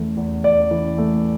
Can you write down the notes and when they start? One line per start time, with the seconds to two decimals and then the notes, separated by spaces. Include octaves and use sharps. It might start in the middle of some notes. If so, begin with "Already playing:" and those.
Already playing: E2 E3 A3
0.17 E2
0.44 E2 D5
0.71 E3
0.98 A3